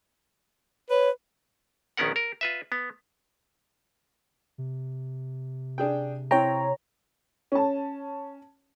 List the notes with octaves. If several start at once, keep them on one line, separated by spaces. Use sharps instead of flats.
B4 C#5
A#1 D#3 B3 C#4 A#4 F#5
A#4
F4 B4 E5
B3
C3
D4 G#4 G5
C4 E4 C#5 G5 A#5
C#4 A5